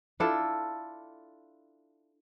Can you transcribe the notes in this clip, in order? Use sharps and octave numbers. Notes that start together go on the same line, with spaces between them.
D4 E4 F4 A4